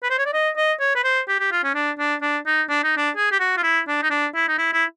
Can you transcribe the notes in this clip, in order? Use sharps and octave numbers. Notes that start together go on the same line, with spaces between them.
B4
C5
C#5
D5
D#5
D#5
C#5
B4
C5
G4
G4
F4
C#4
D4
D4
D4
D#4
D4
D#4
D4
G#4
G4
F#4
F4
E4
D4
D#4
D4
E4
D#4
E4
E4